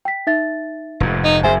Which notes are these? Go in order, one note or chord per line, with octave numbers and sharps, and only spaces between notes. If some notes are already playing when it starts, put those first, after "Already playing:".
G5 B6
D#4 E5 A6
F1 G#2
D#4
F#1 F#2 G#4 C5 E5 G#5